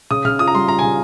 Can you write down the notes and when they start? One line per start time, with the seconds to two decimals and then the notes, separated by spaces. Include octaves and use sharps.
0.10 C#3 D#6
0.25 C#3 F6
0.39 F4 D#6
0.48 A#5
0.55 G3 C6
0.68 F4 A#5
0.79 C#3 G#5